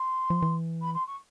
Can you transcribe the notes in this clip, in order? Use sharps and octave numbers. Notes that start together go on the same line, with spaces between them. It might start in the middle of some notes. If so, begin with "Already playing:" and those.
Already playing: C6
F3
E3
B5
C6
C#6